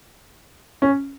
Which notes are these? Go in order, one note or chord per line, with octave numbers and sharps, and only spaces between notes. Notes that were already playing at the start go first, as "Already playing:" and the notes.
C#4